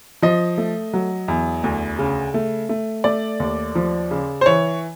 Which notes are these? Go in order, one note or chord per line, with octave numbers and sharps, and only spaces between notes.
F3 D#5
A3
F#3
E2
D2
C#3
A3
A3
A3 D5
D#2
F3
C#3
C5
E3 C#5